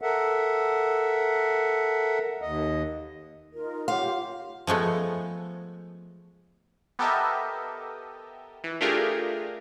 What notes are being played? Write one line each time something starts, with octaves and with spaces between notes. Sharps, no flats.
A4 A#4 E5 F#5
D#2 D#5
D#4 F4 A#4
F4 G4 C#5 F5 F#5 C6 D6
F3 G#3 A3 B3
B3 G4 A4 A#4 D#5 E5
E3
A3 D4 F4 G4 G#4 A#4